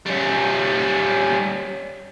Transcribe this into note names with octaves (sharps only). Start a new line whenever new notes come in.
G3 C#4